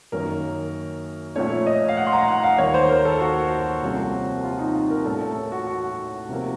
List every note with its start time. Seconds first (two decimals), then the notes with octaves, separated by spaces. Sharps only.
0.12 F#2 D#3 A#3 C#4 A#4
1.35 A#2 F3 A3 C#4 C#5
1.66 D#5
1.89 F5
1.97 F#5
2.07 C6
2.13 A#5
2.28 F#5
2.43 F5
2.58 D#2 D#3 A#3 C#5
2.74 C5
2.90 A#4
3.05 A4
3.21 F#4
3.82 C2 C3 F3 A#3 C#4
4.44 F4
4.59 D#4
4.74 F4
4.90 A#4
5.05 A2 A3 C#4 A4
5.21 A4
5.52 F#4
5.67 F#4
6.29 C3 F3 A#3